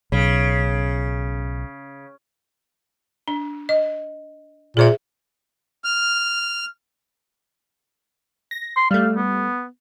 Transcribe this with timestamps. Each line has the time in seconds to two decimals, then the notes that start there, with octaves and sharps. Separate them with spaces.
0.12 B1 C#3
3.28 D4
3.69 D#5
4.77 A#2 G#4 C5 E5
5.84 F6
8.51 A#6
8.76 C6
8.91 G3 A3 F5
9.16 B3